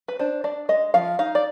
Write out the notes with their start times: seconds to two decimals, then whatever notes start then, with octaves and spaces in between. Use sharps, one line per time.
0.08 B4
0.19 D4 C5
0.44 D4 D5
0.69 G#3 D#5
0.94 F3 F5
1.19 D#4 F5
1.35 D5